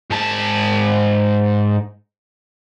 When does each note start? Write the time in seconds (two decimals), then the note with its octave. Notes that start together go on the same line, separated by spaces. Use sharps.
0.10 G#2 A5